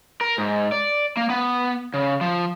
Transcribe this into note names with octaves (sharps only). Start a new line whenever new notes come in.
A#4
G#2
D5
A#3
B3
C#3
F3